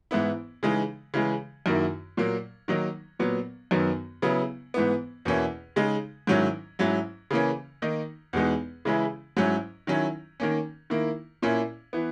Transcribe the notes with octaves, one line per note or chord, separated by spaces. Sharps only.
G#2 E3 B3 E4
C#3 E3 G#3 D#4
C#3 E3 G#3
F#2 D#3 A#3 E4
A#2 F#3 A#3
D#3 F#3 A#3 D#4
A#2 F#3 B3
F#2 D#3 F#3 B3
C#3 F#3 B3 E4
G#2 E3 B3
E2 B2 A#3 C#4 E4
C#3 G#3 D#4
G#2 D#3 F#3 C#4 E4
G#2 F#3 C#4 E4
C#3 E3 A#3 C#4
D#3 A#3 D#4
E2 B2 G#3 B3 D#4
C#3 E3 G#3 C#4 E4
G#2 F#3 C#4 E4
D#3 F#3 C#4 E4
D#3 A#3 C#4
D#3 A#3 E4
A#2 A#3 C#4 E4
E3 B3